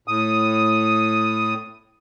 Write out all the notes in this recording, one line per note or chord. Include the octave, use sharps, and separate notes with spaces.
A2 D#6